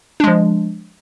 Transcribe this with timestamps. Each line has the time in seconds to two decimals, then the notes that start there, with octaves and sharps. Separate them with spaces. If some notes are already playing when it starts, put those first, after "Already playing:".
0.20 D4
0.24 G#3
0.27 F3